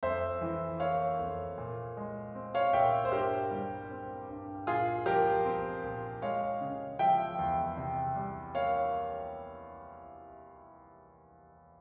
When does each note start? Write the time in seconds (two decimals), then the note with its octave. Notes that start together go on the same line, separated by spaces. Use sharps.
0.03 F2 C5 E5
0.41 E3
0.80 A#3 C#5 F5
1.19 F2
1.58 A#2
1.97 G#3
2.35 C4
2.55 C#5 F5
2.73 A#2 E5 G5
3.05 C5
3.12 G2 G4 A#4
3.51 G3
3.90 C4
4.29 G2
4.67 A#2 F4 G#4
5.06 F3 G4 A#4
5.45 C4
5.83 A#2
6.22 G#3 C#5 F5
6.61 C#3
6.99 F3 E5 G5
7.39 E2
7.77 C3
8.15 G3
8.55 A#3 C#5 F5